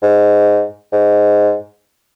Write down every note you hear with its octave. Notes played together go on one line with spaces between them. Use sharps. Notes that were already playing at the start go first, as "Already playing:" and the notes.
G#2
G#2